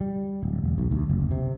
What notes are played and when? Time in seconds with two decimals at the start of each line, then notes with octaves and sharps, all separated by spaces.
0.01 G3
0.43 D1
0.64 E1
0.78 B1
0.91 D2
1.09 F#1
1.31 C3